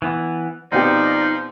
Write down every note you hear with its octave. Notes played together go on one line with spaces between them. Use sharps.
E3 B3
F2 B2 F3 D#4 G4 D5